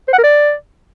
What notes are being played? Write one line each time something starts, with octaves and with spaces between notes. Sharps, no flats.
C5
F#5
A#4
D5